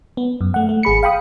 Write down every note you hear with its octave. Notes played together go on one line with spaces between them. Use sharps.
B3
F#2
A3 F#5
A3
G#1 G#4 B5 C#7
F5 G5 B5 D#6